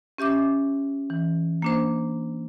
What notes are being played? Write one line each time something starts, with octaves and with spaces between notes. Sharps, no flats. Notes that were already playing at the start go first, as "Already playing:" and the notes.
C#4 G4 E5 D6
E3
A#3 D4 C5